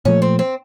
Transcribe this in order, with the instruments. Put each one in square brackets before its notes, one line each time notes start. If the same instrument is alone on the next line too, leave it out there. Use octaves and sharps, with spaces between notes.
[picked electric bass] A#2 F3 A3 [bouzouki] C#4
[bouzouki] C4
C4